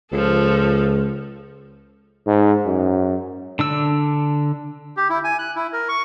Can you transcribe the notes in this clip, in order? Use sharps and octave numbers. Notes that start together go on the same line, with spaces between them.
C#2 F3 A4
G#2
F#2
D3 D4 E6
G4
E4
G#5
F#6
E4
A#4
C#6